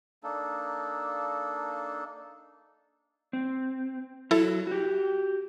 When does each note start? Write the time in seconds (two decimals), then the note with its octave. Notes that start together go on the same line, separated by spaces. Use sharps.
0.23 A#3 D4 D#4 A4
3.33 C4
4.31 F#3 E4 A4
4.67 F#4 G4